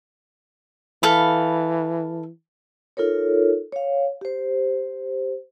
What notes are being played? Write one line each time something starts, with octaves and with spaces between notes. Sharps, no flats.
E3 A4 F5 B5
D#4 F4 A4 A#4 C#5
C#5 F5
G4 C5